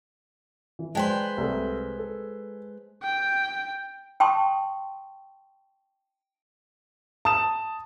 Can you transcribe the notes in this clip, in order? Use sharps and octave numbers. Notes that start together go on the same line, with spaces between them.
E3
G#3 B4 C5 D5 G5 A5
C2 A3
A4
G5
G5 A5 C6 C#6 D#6
A5 D#6 E7